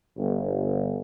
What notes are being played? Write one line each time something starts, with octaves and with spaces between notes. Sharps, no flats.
G1